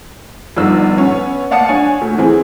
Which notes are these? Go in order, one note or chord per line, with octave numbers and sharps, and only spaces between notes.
G1 F3 B3 D#4 D5 E6
B3 C#4
D5 F5 F#5 A5 D#6 C#7
D4 C#5 G#5
D2
E3 C4 G#4